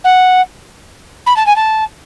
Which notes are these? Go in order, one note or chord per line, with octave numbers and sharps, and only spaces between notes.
F#5
B5
A5
G#5
A5